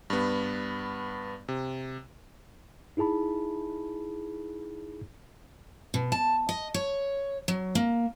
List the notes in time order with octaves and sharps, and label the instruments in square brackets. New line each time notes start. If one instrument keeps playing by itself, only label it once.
[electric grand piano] G2 B3
C3
[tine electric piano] D#4 E4 G#4 A5 B5
[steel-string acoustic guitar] B2
A5
D#5
C#5
F#3
A#3